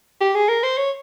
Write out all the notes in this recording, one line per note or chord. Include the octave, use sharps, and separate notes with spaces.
G4
G#4
A#4
C5
C#5